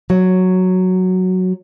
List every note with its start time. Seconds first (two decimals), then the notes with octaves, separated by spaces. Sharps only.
0.10 F#3